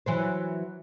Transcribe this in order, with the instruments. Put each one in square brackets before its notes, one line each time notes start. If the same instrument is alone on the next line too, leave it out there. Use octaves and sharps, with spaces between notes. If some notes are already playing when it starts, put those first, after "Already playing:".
[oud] E3 F#3 C5